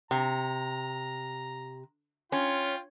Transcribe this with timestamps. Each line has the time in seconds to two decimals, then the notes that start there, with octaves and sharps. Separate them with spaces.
0.11 C3 A#5
2.32 C#4 F4 G5 C6